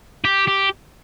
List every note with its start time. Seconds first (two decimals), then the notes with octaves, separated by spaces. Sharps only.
0.25 G4
0.48 G4